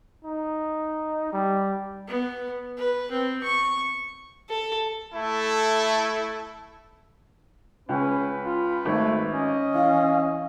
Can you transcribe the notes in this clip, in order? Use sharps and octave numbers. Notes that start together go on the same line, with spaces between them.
D#4
G3
B3
B4
C4
C#6
A4
A3 E4 A4
C#2 C#4 B4
F4
G#1 A3
C#4 D#5
E3 F5